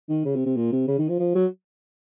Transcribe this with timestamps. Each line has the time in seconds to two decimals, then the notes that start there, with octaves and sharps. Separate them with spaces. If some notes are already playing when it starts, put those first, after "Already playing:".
0.09 D#3
0.25 C#3
0.35 C3
0.46 C3
0.56 A#2
0.72 C3
0.87 C#3
0.98 D#3
1.09 F3
1.19 F3
1.35 F#3